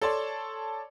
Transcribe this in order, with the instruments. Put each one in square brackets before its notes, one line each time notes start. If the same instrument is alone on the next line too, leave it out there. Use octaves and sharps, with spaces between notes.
[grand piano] A4 C#5 D5 A5 C6